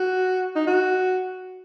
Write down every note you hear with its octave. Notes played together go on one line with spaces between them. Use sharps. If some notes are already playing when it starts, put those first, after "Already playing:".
Already playing: F#4
D#4
F#4